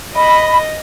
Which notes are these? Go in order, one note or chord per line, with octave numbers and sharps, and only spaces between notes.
D#5 B5